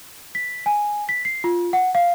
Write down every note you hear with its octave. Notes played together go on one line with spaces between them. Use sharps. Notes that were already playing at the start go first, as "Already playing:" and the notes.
B6
G#5
B6
C7
F4
F#5
F5